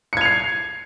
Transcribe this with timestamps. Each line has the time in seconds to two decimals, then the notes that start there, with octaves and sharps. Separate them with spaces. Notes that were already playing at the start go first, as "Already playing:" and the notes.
0.13 C#7
0.17 G#6
0.21 F7
0.25 C7